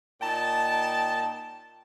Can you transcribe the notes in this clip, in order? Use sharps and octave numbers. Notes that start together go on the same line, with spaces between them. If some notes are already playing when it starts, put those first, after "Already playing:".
A#2 D#4 G5 A5